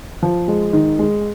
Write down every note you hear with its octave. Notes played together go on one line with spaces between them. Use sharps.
F3
G#3
D#3
G#3